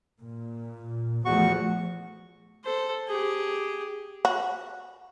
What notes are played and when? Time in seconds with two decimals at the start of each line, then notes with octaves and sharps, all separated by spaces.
0.21 A#2
1.25 E2 F3 A3 F#4 C#6
2.64 A4 C5
3.08 G4 G#4
4.25 F#4